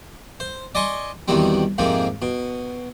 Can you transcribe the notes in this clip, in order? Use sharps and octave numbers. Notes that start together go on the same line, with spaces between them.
C5
D5 D#5 G#5 C6 C#6
E2 B2 D#3 G3 C4
F2 G#2 C3 G#3 A#3
B2